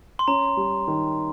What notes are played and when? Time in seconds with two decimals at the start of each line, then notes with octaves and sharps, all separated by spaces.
0.19 C6
0.28 C#4 A#5
0.57 G3
0.88 D#3